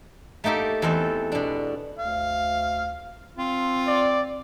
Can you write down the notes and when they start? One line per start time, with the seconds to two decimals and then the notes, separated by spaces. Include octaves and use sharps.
0.44 A3 A#3 D#4 G4 A4
0.82 E2 C4 A4 D#5
1.32 B2 D4
1.98 D2 F5
3.38 C4 F4
3.87 D5